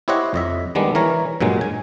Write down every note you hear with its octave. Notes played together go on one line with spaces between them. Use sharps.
E4 G4 C5 C#5 D#5 F#5
F2 D#5 E5
D#3 G3 G#3 B3 D4
E3 A#4 C#5 A#5
G2 A#2 F#3 G#3
G#5